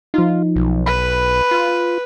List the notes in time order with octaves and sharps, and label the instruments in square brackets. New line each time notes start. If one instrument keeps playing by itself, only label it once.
[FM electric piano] F3 D#4 [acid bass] F4
[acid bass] B1
[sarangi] B4 [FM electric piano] B5
[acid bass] F4